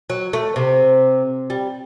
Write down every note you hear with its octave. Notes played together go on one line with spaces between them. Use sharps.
F#3
A3
C3
G3